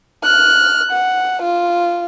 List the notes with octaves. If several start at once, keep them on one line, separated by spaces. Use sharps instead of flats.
F6 F#6
F#5
F4